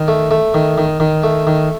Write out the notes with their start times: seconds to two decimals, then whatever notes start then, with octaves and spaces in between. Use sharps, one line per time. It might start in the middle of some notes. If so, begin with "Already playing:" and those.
Already playing: D#3
0.08 A3
0.31 A3
0.54 D#3
0.78 D#3
1.00 D#3
1.24 A3
1.47 D#3